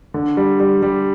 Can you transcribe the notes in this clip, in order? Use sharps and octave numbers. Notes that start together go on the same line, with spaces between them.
D3
G3
G3
G3